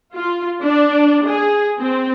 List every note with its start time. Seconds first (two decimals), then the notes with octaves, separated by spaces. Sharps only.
0.14 F4
0.63 D4
1.25 G#4
1.80 C4